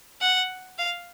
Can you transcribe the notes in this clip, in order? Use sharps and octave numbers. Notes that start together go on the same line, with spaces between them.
F#5
F5